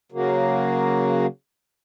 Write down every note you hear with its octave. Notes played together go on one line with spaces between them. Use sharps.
C#3 F#3 A#3